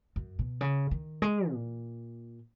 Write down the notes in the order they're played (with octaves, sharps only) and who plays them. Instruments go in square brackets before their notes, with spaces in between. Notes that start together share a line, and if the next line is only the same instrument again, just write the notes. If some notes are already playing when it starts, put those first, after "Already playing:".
[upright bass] F#2
B2
C#3
D#3
G#3
A#2